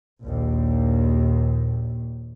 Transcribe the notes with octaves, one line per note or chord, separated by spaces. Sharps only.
A#1 D#2